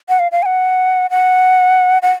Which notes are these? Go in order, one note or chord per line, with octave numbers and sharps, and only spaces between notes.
F#5
F5
F5
G#5
F#5
F#5
F#5